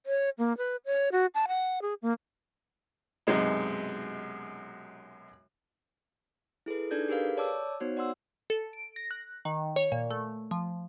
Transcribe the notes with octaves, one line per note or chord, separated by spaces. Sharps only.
C#5
A#3
B4
C#5
F#4
A5
F#5
G#4
A#3
B1 F#2 C3 G#3 D#4
E4 G#4 A4 B4
D4 D#4 A4 D5 G6 G#6
G4 G#4 A#4 B4 F5
C#5 D5 A5 D6 E6
B3 D#4 F#4 C5 C#5
D5 F#5 C6 E6
A4
D7
A#6
F#6
D#3
C#5
A#2
A3
F3